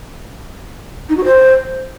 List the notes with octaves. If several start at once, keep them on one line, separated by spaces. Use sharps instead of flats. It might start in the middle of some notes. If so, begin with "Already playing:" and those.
D#4
F#4
C5